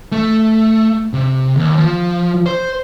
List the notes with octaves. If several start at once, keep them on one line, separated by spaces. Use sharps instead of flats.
A3
C3
D#2
F3
C5